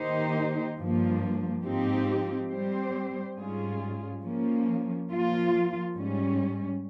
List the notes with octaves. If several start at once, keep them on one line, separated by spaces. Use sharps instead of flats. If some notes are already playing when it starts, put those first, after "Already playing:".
Already playing: D#3 A#3 D#4 G4 C5
G2 F3 A#3
G#2 F3 C4 D#4 G4
G3 C4 G4 C5
G#2 G3 C#4 F4 G#4
F3 A#3 C#4
F3 A#3 F4
G#2 G3 C#4